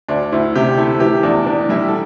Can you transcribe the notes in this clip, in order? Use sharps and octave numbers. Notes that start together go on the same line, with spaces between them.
D2 D4
D2 E4
C3 G4
A3 E4
E3 G4
E2 D4
E3 D4
D4
G3 E4
A4